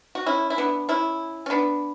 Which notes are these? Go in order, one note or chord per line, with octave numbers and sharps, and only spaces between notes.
F#4
C#4 E4
E4
B3 D4
C#4 E4
C#4
B3 D4